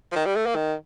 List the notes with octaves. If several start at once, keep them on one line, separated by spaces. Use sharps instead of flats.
F3
D#3
G3
A3
A#3
D#3